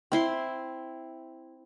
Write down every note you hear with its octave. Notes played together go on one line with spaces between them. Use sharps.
C4 E4 C6